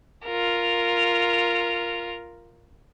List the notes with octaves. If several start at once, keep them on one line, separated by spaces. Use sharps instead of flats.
F4 A#4